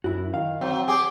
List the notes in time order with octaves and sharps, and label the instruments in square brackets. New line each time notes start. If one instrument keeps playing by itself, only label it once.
[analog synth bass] F#2 [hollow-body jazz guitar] E4 F#4
[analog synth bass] D#3 [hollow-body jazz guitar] F5
[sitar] F#3 [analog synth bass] C4
[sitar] G4 G#4 [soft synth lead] D6